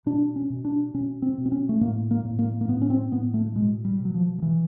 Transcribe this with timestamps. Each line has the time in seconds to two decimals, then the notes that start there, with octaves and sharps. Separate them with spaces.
0.06 B2 D4
0.36 C#4
0.50 B2
0.65 D4
0.94 B2 C#4
1.22 C4
1.38 B2
1.46 C4
1.52 C#4
1.69 A3
1.81 A2 A#3
2.11 A#3
2.24 A2
2.39 A#3
2.61 A#3
2.68 A2 B3
2.82 C#4
2.90 C4
3.12 A2 B3
3.34 A3
3.46 A3
3.56 B2 G#3
3.85 G3
3.99 B2
4.05 F#3
4.14 F3
4.38 F3
4.42 B2 E3